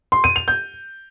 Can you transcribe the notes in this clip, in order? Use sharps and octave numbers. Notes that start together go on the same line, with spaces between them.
C6
D#7
F7
G6